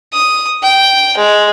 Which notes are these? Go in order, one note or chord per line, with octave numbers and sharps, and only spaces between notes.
D#6
G5
G#3